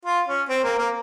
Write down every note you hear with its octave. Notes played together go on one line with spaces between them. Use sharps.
F4
C#4
C4
A#3
A#3